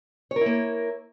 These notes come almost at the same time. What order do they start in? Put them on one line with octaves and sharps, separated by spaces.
C#5 A#4 E4 A#3